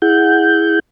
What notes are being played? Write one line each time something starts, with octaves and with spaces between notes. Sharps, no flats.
E4 G#4 F#5 G6